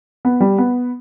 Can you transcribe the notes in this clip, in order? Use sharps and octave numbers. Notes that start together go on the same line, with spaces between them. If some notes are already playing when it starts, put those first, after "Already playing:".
B3
G3
B3